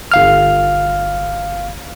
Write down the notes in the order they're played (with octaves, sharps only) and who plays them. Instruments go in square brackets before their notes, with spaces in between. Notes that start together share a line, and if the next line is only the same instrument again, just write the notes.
[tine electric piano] G1 F5 F6